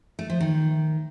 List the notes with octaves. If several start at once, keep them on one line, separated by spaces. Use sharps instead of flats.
A3
F3
D#3